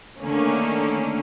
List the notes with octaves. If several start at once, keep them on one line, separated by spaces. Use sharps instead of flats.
D3 D#3 A3 A#3 C#4